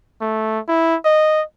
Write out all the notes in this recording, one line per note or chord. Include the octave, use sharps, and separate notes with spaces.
A3
E4
D#5